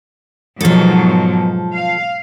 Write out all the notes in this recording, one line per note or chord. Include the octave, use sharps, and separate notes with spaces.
G#2 B2 F3 F#3 A4
F5